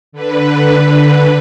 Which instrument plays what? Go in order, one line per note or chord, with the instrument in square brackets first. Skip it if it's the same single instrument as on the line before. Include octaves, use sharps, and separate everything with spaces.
[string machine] D3 B4